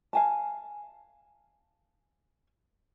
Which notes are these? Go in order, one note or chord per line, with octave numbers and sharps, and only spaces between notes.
F5 G#5 A5